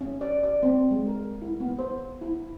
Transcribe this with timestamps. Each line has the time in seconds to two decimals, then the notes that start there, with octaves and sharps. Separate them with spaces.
0.01 C#4
0.21 D5
0.43 D5
0.63 C4
0.91 G#3
1.07 A#4
1.42 E4
1.60 B3
1.79 C5
2.21 E4